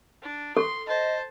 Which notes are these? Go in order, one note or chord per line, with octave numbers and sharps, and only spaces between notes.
D4
A4 C6
C5 D#5 A5